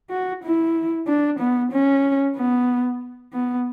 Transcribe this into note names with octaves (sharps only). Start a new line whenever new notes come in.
F#4
E4
D4
B3
C#4
B3
B3